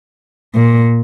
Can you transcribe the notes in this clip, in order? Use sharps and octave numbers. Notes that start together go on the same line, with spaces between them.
A#2